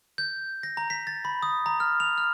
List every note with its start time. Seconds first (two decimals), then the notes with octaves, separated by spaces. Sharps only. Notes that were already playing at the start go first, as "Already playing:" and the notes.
0.18 G6
0.63 A#6
0.77 A#5
0.90 B6
1.07 A6
1.25 B5
1.43 D#6
1.66 A#5
1.80 F6
2.00 F7
2.18 F6